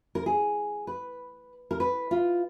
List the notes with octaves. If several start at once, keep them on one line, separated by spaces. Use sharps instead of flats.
A#4
G#4
B4
A#4
B4
F4